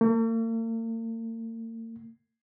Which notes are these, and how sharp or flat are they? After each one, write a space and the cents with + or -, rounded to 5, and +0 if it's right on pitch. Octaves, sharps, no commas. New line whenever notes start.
A#3 -45